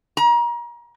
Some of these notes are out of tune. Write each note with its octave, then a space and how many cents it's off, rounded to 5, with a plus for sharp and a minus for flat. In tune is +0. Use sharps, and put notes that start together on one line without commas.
A#5 +35